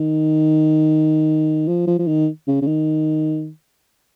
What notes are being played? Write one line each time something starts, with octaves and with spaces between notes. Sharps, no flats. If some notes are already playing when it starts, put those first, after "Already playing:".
Already playing: D#3
F3
F3
F3
D#3
C#3
C#3
D#3